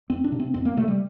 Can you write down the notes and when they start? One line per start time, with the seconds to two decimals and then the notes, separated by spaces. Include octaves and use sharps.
0.10 F2 C4
0.24 D4
0.32 C3
0.40 C4
0.54 F2 C4
0.65 A#3
0.77 C3 A3
0.88 G3